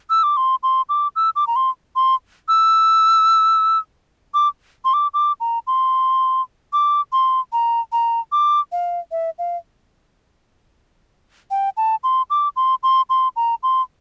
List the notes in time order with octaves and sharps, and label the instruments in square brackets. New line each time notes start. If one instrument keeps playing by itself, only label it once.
[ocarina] E6
D6
C6
C6
D6
E6
D6
A#5
C6
C6
E6
D6
C6
D6
D6
A#5
C6
D6
C6
A#5
A#5
D6
F5
E5
F5
G5
A5
C6
D6
C6
C6
C6
A#5
C6